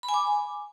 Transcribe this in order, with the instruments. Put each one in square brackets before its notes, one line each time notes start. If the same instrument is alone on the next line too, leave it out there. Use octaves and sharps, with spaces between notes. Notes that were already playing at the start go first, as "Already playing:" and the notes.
[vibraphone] B5
G#5
D6